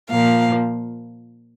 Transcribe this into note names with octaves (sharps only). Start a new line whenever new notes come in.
A#2 F3 A#3 F5